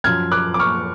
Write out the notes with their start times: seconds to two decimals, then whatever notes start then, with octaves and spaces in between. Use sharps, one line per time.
0.04 F#2 F3 F6 G#6
0.31 D6 F#6
0.54 D6
0.59 C#6 F6